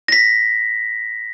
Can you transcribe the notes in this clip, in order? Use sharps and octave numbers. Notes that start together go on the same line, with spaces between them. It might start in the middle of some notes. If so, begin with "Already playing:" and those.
A#6 B6